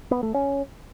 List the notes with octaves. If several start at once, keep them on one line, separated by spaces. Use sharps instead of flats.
B3
A3
C#4